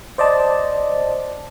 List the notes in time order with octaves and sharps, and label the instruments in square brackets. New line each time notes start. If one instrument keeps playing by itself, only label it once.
[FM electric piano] C5 D5 D#5 A5